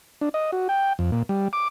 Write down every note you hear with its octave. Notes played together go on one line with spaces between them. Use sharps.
D4
D#5
F#4
G5
F2
A#2
G3
D6